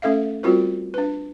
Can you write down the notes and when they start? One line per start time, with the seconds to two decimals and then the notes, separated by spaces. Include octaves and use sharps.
0.02 A3 C#4 A4 E5 F5
0.43 G3 C4 F4 F#4 A#4 C5
0.94 D4 B4